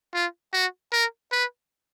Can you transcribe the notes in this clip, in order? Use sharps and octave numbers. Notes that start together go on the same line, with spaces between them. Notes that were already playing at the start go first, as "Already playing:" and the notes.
F4
F#4
A#4
B4